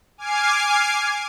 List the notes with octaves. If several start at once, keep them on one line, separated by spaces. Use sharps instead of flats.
G#5 D6 F6 G#6 C7